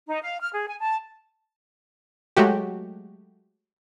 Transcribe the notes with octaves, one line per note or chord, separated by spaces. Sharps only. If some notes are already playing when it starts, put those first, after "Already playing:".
D#4
F5
F6
G#4
G#5
A5
F#3 G#3 A3 F#4 G4